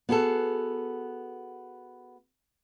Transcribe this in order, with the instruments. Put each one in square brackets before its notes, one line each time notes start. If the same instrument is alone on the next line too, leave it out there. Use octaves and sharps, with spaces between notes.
[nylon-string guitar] B3 F#4 G#4 A4